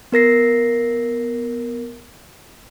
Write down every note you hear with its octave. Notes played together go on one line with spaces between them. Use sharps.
B3 A#4 A#6 C7